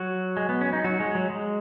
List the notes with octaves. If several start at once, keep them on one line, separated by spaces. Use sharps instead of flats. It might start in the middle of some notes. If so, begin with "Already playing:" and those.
Already playing: F#3 F#4
G#3
B3
C#4
D#4
F#3 F#4
G#3
F#3
G#3